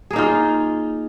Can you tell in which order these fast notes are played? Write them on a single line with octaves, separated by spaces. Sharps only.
G#4 A#3 D#4 F4